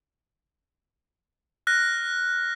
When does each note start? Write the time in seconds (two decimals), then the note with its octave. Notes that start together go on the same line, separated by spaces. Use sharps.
1.67 F6 F#6 A#6